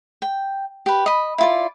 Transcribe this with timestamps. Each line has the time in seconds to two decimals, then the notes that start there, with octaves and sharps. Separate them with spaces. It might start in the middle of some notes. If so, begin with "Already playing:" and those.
0.22 G5
0.86 G4 B4
1.06 D#5 B5
1.38 E4 F4 D5